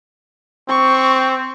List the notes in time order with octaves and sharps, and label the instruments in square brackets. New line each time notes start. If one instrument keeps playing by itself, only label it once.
[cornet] C4 [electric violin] C#6